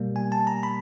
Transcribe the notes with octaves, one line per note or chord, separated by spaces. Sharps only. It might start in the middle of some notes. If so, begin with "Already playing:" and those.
Already playing: B2 G3 A#3
G#5
A5
A#5
B5